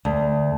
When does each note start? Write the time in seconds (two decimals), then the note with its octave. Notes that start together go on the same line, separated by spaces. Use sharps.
0.05 D2